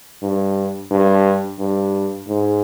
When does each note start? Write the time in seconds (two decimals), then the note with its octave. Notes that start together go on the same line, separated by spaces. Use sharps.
0.23 G2
0.91 G2
1.59 G2
2.28 G#2